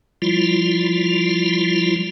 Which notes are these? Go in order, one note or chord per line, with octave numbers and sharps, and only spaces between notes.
F3 G3 E4 F4